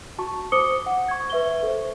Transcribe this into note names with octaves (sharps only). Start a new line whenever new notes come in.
F#4 A5 C#6
C5 D6 D#6 C#7 G7
F#5
C#6 G#6
B4 E5 C#6 G7
A4 C5